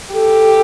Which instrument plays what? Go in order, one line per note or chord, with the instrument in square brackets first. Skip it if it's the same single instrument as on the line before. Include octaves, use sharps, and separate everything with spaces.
[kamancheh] G4 [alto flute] A4